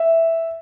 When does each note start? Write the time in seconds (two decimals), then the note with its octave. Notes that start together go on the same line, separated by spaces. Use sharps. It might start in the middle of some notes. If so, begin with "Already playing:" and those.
Already playing: E5